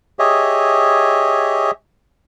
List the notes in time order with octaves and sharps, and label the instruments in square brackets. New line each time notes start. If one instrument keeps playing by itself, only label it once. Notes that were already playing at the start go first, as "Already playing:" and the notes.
[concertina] G4 G#4 C#5 D#5 E5